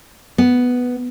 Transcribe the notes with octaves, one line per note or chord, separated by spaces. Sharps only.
B3